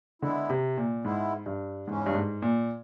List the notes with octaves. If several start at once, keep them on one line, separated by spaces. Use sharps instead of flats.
D3 G#3 B3 E4
C3
A#2
G#2 G#3 B3 E4
G2
E2 G#2 C#3 E3 G#3 C#4
G2
G#2
A#2